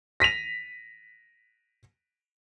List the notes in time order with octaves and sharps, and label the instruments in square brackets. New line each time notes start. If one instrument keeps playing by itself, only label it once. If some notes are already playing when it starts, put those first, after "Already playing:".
[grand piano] A#6 B6 D#7 F7